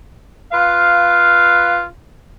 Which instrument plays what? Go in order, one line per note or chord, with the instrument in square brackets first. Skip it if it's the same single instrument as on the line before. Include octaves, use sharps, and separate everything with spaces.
[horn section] F4 B4 F5